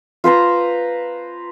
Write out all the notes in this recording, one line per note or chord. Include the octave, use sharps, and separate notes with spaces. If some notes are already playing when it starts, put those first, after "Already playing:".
F4 B4 C5 A#5